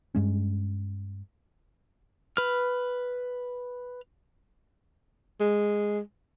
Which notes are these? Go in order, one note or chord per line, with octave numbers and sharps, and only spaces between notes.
G2 G#3 C#4
B4 F6
G#3